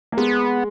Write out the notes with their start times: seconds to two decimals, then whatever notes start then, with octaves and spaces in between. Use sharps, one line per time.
0.12 A#3
0.17 G#3 B3